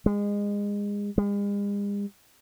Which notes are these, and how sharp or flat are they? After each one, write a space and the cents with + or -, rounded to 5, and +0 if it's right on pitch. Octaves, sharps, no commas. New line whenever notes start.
G#3 -25
G#3 -45